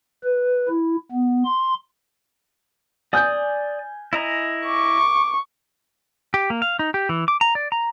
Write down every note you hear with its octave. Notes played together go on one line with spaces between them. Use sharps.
B4
E4
B3
C6
D5 G#5 D#6 G6
E4 D#5 A#5
C#6 D6
G4
A#3
F5
D#4
G4
E3
D6
A#5
D5
A#5